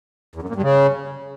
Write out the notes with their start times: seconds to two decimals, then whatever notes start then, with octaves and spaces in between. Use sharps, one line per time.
0.35 E2
0.42 F#2
0.49 A#2
0.56 G2
0.62 C#3